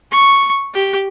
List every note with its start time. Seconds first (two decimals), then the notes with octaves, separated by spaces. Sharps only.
0.11 C#6
0.74 G4